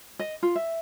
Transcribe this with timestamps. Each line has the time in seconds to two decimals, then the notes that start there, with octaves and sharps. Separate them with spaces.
0.19 D#5
0.43 F4
0.56 E5